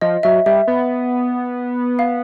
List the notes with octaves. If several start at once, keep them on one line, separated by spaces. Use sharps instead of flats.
F3 D#5
F#3 E5
G3 E5
B3
F5